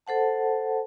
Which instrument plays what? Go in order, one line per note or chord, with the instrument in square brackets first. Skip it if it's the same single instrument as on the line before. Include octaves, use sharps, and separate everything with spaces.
[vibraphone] A4 C5 F#5 A5